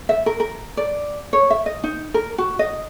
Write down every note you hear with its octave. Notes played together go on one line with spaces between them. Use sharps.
E5
A#4
A#4
D5
C#5
E5
D#5
D#4
A#4
F#4
D#5